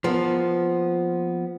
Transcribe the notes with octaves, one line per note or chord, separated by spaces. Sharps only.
F3 A#3 B3